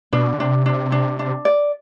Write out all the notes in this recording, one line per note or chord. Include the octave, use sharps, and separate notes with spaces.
B2 D4
D3
C3 D4
D4
D4
D4
D5